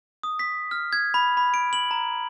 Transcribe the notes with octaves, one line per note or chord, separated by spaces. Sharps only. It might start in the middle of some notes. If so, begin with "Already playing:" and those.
D#6
B6
F6
G#6
B5
B5
D7
F#7
A#5